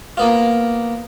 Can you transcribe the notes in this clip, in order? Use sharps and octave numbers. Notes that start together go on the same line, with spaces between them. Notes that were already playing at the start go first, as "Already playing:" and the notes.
A#3 B3 F4